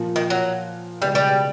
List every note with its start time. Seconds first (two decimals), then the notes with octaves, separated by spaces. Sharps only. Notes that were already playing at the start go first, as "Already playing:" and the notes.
Already playing: A#2 F3 A#3
0.16 D#3
0.30 F#3
1.01 C#2 B2 G3 G#3
1.15 G3